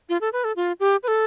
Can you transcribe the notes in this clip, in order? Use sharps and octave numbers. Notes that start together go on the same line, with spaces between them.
F4
A4
B4
A4
F4
G4
B4
A4